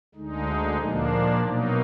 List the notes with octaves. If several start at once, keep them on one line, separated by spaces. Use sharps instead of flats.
D2 D3 G#3 D#4
A#2 F3 A#3 D4
B2 F#3 A#3 D#4